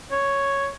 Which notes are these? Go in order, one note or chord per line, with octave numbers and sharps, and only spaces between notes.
C#5